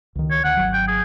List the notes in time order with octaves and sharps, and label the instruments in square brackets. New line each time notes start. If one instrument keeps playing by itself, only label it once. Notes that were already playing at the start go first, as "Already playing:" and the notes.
[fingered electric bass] C#2 D#3
[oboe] C#5
[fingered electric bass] D2 [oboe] F#5
[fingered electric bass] G#1 F#3
[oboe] G5
G#4